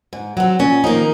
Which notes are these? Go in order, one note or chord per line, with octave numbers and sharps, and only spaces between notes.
G#2
F#3 C4
A#2 C#4
D#3 F3 A#3 D#4